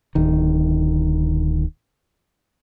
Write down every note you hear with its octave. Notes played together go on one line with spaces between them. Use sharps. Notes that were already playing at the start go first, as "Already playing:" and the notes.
D1 D#3